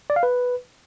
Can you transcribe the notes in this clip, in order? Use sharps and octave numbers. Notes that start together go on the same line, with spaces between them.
D5
F5
B4